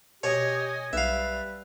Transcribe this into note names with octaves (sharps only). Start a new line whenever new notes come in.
B2 G4 C#5 D#5 G#5
B1 G3 B4 E5 F5